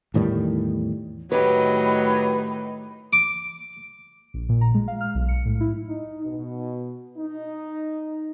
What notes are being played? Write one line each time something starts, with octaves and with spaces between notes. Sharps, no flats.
E2 A2 D#3 G3
A2 D#3 F#3 D#4 G4 B4 B5
D6
A#1
A#2
A#5
G#3
F5
F6
B1
C#7
A2
E4
D#4
B2
D#4